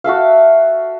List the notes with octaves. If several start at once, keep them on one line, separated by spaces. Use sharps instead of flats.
F#4 A4 E5 F5